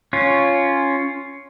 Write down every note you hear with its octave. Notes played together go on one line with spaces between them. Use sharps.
C#4 F4